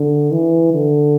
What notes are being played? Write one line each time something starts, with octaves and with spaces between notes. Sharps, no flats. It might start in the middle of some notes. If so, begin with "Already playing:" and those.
Already playing: D3
E3
D3